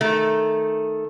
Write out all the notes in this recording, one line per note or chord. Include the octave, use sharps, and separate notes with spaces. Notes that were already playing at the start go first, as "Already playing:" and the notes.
D#3 A3